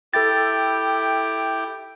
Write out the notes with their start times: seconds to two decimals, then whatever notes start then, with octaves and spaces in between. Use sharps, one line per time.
0.14 E4 G4 A4 G5 A6